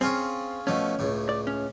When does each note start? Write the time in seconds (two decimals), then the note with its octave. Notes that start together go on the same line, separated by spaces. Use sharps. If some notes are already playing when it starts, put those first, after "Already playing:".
0.01 C4 C#4 F4 G#4
0.67 B2 F3 A3 C#4
0.99 C#2 A2
1.29 D5
1.47 C#4